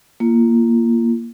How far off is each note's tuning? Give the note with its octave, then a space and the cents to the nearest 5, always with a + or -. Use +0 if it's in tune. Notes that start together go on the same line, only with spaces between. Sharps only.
A#3 +0 F4 -30